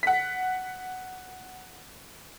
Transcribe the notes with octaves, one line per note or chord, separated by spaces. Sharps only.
F#5 B6